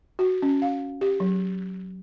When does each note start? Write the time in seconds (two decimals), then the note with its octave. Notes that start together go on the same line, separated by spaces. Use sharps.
0.19 F#4
0.42 C#4
0.62 F5
1.01 G4
1.20 F#3